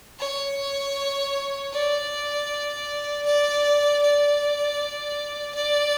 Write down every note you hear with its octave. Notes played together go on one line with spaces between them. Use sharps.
C#5
D5
D5
D5
D5